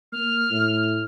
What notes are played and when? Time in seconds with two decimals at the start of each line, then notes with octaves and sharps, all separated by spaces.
0.12 A#3 F6
0.50 A2